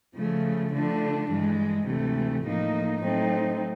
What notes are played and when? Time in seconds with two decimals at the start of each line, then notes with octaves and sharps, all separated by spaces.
0.15 C#3 F3 A3
0.72 D3 F3 A3 D4
1.30 G2 E3 G#3
1.87 D2 C3 E3 A3
2.44 A2 F3 A#3 D#4
3.02 A2 F#3 A3 C4 D#4